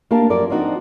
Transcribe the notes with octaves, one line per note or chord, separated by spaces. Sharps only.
A#3 D4 G4 A#4 F5 A5
F#2 F3 A#4 D5
F3 C4 D4 D#4 F#4